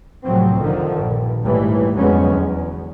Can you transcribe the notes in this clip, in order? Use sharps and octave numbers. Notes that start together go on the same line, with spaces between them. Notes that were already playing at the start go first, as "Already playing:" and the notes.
C2 A2 C3 F3 F#3 C4
F2 D3 D#3 F3
A#1 G2
G#1 D#2 A2 E3 G3
F2 D3 F#3 G#3 B3 C#4
E2